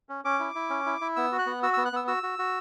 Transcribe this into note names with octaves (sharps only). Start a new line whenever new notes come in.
C#4
C#4 D6
E4
E4
C#4
E4
E4
B3 E6
F#4
F#6
B3
F#4 E6
B3 E6
F#6
B3 E6
F#4 E6
F#4
F#4